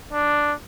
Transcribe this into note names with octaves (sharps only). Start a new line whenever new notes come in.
D4